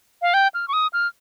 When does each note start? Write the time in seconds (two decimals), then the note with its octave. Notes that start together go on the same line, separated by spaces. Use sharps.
0.22 F5
0.34 G5
0.54 F6
0.68 C#6
0.73 D#6
0.93 F6